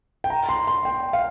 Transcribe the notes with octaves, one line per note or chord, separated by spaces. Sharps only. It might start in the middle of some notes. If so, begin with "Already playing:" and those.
G5
A#5
C6
C6
G5
F5